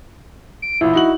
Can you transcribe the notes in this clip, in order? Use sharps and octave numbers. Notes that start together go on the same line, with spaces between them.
D7
A1 A#2 E4
D#4 F#4 F#7